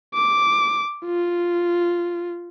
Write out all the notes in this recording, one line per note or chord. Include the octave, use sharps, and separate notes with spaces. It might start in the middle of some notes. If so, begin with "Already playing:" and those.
D6
F4